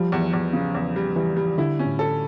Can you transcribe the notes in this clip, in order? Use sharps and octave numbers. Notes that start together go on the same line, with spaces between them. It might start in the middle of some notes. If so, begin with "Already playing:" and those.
Already playing: F3 G3
E2
E2
C#3
E2
G3
E3 G3
G3
D3 E4
C#4
A2
A4